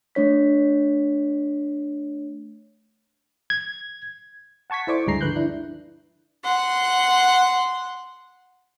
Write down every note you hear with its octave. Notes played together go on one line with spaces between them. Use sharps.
A3 D4 C#5 B6
G#6
F#5 A5 C#6 G#6 B6
E4 A4 C5 D5 C#6 D6
D2 G2 G#3 G#4 A#5 C7
D3 F3 B4 F#6 G6
D4 E4
F#5 C6